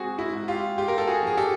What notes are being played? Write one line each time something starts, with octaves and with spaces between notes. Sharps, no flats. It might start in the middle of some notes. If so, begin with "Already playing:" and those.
Already playing: G#2 C4 F#4 G#4
E4 F#4
G#2
F4 G4
G#3 F4 G4
A#4
A4
F#4 G#4
F3 G#4
G4 A4